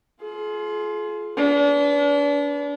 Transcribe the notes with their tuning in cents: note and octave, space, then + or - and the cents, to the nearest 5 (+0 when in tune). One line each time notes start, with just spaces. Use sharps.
F4 +0 G#4 +40
D4 -35 B4 +0